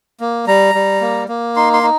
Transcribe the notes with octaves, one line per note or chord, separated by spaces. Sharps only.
A#3
G3 A#5
G3
A#3
A#3
D#4 C6
C6
D#4